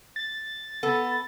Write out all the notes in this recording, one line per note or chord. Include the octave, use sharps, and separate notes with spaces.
A6
B3 A4